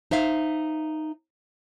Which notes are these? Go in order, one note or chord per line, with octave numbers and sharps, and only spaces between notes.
D#4 C5 E5 F5